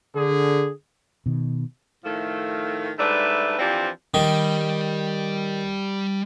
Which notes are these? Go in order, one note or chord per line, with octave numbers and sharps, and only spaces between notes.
D3 G#4
B2 D#3
A2 D#3 F3 A3
G#2 G3 A3 D4 B4 E5
E3 F3 C4 D4 F4 G4
D#3 G3